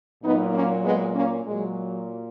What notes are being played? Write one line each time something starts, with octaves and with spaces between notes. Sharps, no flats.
A#2 F#3 B3 D#4
A#3 C#4
G#3 B3
A#3 C#4
A#2 F#3 G#3